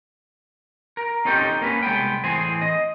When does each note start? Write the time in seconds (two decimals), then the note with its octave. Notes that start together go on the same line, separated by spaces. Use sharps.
0.97 A#4
1.25 C4 C#4 D#4 G4 A4 G5
1.61 A#3 C#4 B4
1.83 C2 G#3 B3 G5
2.24 A2 E3 C4 G#4 C5 G#5
2.61 D#5